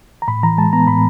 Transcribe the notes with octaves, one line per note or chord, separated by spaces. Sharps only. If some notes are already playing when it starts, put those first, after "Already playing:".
A#5
A2 B5
E3 A#5
G#3 A5
B3 A#5
A2 B5